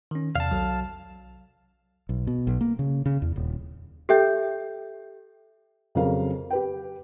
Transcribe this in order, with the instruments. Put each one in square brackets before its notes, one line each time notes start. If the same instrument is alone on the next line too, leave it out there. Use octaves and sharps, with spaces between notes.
[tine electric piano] D#3 C#4
[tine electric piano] E2 C3 [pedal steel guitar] F5 A5
[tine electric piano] B1 F#3
[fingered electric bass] B1
B2
B1
A#3
C#3
C#3
E2
D#1
[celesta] G4 A4 E5 G5 G6
[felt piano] F2 C#3 F#3 G#4 A#4 F5
G4 B4 G5